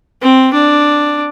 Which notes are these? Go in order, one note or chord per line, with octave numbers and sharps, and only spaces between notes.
C4
D4